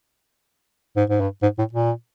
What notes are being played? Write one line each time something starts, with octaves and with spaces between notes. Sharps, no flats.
G#2
G#2
G2
G#2
A2
A#2